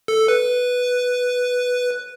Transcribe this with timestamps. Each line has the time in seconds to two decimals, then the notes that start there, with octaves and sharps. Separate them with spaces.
0.08 A4
0.28 B4